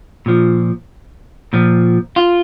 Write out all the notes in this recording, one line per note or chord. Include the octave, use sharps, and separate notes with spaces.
A#2 F3
A#2 F3
F4